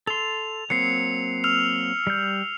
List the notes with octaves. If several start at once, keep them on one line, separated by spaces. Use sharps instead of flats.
A4 C6 F7
F#3 A#3 C4 C7 C#7
E6 F6 F7
G3 G6